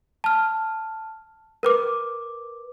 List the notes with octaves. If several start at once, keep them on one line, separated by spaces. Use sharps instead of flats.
A5 F6
A#4 B4 D6